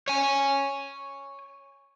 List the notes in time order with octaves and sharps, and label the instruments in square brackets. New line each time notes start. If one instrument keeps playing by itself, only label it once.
[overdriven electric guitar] C#5 G#5